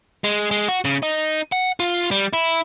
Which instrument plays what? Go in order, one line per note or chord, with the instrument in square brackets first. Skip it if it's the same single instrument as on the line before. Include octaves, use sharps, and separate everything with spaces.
[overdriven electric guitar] G#3
G#3
F#4
C#3
D#4
F#5
F4
G3
E4